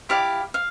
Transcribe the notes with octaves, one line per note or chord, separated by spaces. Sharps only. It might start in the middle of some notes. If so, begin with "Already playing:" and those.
E4 G4 D5 F5
F5